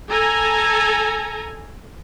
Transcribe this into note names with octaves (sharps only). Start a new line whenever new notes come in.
A4 G#5 A#5